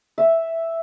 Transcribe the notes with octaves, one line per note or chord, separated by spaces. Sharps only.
E5